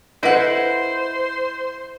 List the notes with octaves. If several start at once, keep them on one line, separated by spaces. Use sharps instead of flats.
E4 A4 B4 C5 D#5 F#5